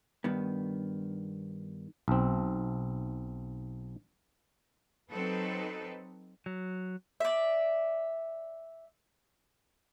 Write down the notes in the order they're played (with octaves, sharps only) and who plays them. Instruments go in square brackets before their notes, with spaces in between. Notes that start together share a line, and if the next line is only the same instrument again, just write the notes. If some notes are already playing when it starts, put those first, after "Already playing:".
[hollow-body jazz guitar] G2 D#3 B3
[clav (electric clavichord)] B1 C4
[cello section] F#3 C4 D#4 A4 B4
[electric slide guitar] F#3
[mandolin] D5 E5